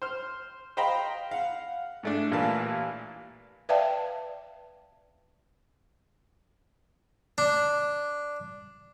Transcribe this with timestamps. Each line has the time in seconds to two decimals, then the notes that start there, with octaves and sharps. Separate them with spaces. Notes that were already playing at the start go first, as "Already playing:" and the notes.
0.02 C5 F6
0.77 C5 D#5 F5 G5 A#5 B5
1.31 F5 F#5
2.03 G#2 A3 D4
2.31 A1 A#2 E3 A#4 F5 A5
3.69 B4 D5 E5 F5 G5 A5
7.38 D4